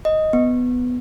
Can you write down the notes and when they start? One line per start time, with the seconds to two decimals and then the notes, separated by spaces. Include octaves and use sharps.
0.05 D#5
0.33 B3